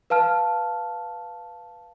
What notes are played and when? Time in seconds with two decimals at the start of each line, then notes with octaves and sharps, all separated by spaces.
0.10 B4 F5 A5 F6